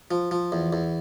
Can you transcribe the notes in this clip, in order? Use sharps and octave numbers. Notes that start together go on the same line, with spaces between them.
F3
F3
E2
E2